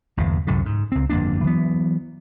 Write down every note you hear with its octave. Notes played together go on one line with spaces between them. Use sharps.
G1 E2 C3
C2 F#2 A2 D3
G#2
C#2 C4
G1 F2 A#3 D4
E3 F#3 B3